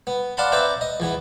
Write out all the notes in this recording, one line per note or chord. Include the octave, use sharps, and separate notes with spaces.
B3
D5 F5 F#5 A5 B5 C6
C4 B4 D5 E5 G5 A#5
D#5
E2 E3 B3